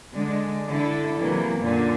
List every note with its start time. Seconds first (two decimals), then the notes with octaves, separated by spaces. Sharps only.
0.14 D3 G#3 D4
0.68 D3 E4 A4
1.20 C3 E3 F#3 A#3
1.60 F#2 A#2 D3